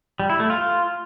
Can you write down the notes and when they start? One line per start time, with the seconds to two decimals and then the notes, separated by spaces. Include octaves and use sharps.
0.20 G3
0.30 E4
0.40 A3
0.50 F4